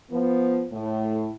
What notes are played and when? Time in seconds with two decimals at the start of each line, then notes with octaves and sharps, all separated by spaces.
0.11 F3 B3
0.73 A2